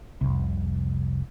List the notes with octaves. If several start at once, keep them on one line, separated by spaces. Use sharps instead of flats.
F1 C2